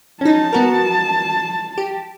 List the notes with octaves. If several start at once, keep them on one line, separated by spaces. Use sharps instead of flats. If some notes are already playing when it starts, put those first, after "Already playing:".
C#4 D#4 A5
B3 F#4 A#4
G4